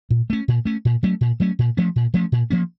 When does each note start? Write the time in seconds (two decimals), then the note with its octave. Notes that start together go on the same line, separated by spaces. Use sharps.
0.11 A#2
0.30 A3 C#4
0.48 A#2
0.65 A3 C#4
0.85 A#2
1.03 F#3 A3 C#4
1.21 A#2
1.40 F#3 A3 C#4
1.59 A#2
1.77 F3 A3 C#4
1.96 A#2
2.14 F3 A3 C#4
2.32 A#2
2.50 F3 A#3 C#4